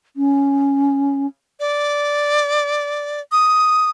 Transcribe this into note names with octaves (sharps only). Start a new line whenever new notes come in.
C#4
D5
D#6